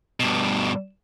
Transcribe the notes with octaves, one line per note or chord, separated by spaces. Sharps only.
G2 B2